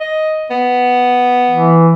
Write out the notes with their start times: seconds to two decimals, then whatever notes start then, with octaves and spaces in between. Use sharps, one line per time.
0.01 D#5
0.51 B3
1.50 E3